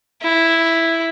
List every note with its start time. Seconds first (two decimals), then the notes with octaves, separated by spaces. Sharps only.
0.22 E4